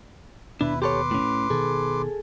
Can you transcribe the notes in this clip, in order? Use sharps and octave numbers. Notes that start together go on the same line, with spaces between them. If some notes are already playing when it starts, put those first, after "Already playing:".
D#2 B2 D4 E4 B4
G4 A4 B4 C#5 C6 D6
A2 C#4
B2 D#3 G#4 A4